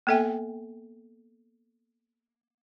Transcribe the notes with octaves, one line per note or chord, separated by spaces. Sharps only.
A#3 B3 A4 E5 G5 G#5